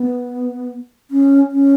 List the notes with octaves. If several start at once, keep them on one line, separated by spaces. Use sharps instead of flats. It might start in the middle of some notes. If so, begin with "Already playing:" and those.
Already playing: B3
C#4
C#4